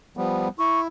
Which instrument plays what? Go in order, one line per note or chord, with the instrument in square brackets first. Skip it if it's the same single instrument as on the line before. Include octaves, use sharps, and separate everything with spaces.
[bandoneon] F3 G3 B3
[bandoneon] E4 [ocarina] C#6